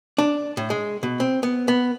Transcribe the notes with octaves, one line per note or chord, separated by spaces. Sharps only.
D4
A2
G#3
B2
C4
B3
B3